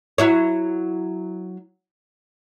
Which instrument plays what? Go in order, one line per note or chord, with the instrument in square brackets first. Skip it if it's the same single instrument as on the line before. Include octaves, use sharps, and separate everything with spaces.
[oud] F#3 E4 C#5